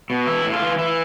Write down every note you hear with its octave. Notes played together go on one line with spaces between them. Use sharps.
B2
E3 E4
A2
F4
E3
E3 E4